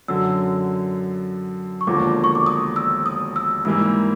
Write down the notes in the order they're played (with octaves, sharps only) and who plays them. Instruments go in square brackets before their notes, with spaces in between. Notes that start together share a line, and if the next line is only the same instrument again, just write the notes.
[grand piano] F#2 D3 F#3 [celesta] E6
[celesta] C#6
[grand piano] E1 D#2 D3 F3 A#3 [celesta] D6
[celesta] C#6
D6
D#6
E6
D#6
E6
[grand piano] G#2 E3 G3 A#3 [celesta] E6